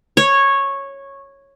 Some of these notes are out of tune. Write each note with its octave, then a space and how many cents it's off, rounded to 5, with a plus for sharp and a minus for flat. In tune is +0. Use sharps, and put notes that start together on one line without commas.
C#5 -10